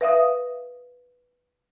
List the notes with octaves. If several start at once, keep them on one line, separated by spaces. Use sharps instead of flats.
B4 E5 F5 D#6